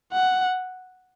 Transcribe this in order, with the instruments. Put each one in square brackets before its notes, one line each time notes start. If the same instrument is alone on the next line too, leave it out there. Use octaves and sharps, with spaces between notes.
[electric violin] F#5